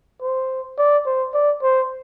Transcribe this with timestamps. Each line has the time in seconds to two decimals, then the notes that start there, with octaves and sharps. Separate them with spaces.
0.22 C5
0.78 D5
1.06 C5
1.34 D5
1.62 C5